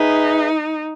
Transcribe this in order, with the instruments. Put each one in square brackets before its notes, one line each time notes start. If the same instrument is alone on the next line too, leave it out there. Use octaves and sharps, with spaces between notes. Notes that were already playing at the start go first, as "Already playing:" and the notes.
Already playing: [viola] D#4 [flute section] G#4 B4 E5